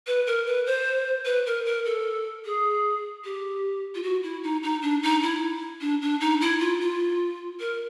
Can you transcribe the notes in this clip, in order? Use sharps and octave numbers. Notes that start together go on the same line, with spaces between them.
B4
A#4
B4
C5
B4
A#4
A#4
A4
G#4
G4
F4
F#4
E4
D#4
D#4
D4
D#4
E4
D4
D4
D#4
E4
F4
F4
A#4